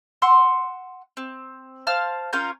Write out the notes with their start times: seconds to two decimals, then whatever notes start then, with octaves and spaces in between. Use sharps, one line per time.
0.22 F#5 C6 E6
1.17 C4
1.87 C5 F5 A5 F6
2.33 C#4 F4 A#4 G6